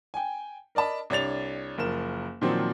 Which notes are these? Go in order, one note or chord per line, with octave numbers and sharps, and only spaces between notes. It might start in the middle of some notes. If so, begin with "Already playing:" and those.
G5 G#5
A#4 D5 D#5 A5 B5
C2 D4 C#5 A6 F7
F#1 F3 A#4 E7
A#2 D#3 F3 F#3 C4